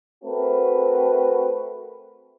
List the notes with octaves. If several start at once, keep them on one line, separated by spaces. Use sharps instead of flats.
A3 C4 F#4 A#4 B4